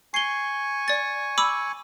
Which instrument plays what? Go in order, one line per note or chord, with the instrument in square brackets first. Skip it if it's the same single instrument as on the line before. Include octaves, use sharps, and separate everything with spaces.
[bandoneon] G#5 C#6 [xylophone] C7 G7
[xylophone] D5 A6
B5 D6 E6